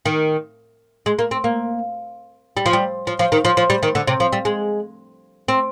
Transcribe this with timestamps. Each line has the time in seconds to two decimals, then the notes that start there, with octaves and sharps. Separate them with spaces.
0.05 D#3
1.06 G#3
1.19 A#3
1.31 C4
1.44 A#3
2.57 G3
2.66 F3
2.73 G3
3.07 F3
3.19 F3
3.32 D#3
3.45 F3
3.57 F3
3.70 G3
3.83 D#3
3.95 D3
4.07 C3
4.20 F3
4.33 G3
4.45 G#3
5.48 C4